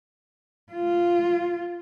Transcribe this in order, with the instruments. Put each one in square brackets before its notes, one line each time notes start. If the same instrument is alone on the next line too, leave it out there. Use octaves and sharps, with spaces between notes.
[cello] F4